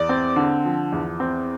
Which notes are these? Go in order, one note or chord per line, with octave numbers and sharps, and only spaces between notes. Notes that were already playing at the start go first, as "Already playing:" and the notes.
Already playing: E2 D5
C4
D3
F3
E2
C4